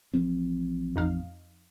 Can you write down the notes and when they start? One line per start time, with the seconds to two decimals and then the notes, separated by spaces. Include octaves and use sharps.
0.14 A1 F3 C4
0.96 F2 D#4 F5